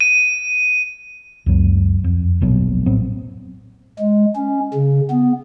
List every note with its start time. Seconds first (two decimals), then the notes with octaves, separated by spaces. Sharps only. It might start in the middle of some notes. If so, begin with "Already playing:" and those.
0.01 D#7
1.46 C#2 F#2 F#3
2.04 F2
2.41 D#1 A#1 B2 F#3
2.86 A2 F#3 B3 C4
3.99 G#3
4.36 C#4
4.74 C#3
5.10 B3